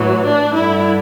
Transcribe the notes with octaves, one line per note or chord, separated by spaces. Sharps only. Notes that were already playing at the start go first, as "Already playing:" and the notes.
Already playing: A2 E3 F#3
D4
G2 D3 E4